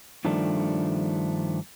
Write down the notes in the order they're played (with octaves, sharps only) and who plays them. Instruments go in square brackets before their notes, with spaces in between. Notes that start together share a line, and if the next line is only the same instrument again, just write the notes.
[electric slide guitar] G2 D#3 F3 A3 D4